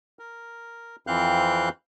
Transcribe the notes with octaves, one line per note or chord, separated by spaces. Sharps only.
A#4
F2 E3 C4 F5 F#6 G6